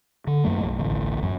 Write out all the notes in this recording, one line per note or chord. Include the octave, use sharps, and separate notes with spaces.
D3
F#2 F#3 A3 A#3
B1
A1 D2
F#2